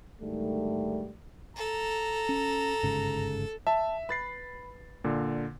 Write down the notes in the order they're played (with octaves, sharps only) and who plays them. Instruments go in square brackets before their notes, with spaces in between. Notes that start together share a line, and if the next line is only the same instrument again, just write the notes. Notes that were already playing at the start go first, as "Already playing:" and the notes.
[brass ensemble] G#2 D3 D#3 G3 A3
[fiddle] A4 [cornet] A#5
[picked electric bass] C#4
G1 G#2 C#3
[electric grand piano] E5 [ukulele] A5
[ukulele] B4 [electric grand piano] B5 A6 C7
[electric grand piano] A#2 D3